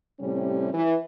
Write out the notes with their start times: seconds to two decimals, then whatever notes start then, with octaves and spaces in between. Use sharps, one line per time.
0.20 A2 C3 G3 C#4 G4
0.73 E3